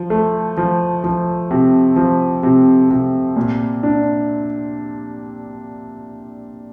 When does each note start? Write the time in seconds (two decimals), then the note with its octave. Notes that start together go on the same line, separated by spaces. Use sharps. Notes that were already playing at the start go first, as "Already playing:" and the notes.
Already playing: F3
0.10 A3
0.57 F3
1.04 F3
1.51 C3
1.96 F3
2.43 C3
2.90 C3
3.36 A#2
3.83 D4